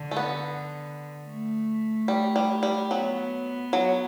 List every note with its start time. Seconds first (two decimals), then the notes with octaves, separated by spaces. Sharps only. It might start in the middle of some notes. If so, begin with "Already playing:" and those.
Already playing: D3
0.11 A3
0.17 B3
1.27 A3
2.08 G3
2.36 G3
2.63 G3
2.91 F#3 B3
3.73 F#3